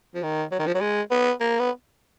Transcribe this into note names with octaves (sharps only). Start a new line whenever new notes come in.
F3
D#3
F#3
D#3
F3
F#3
G#3
B3
A#3
B3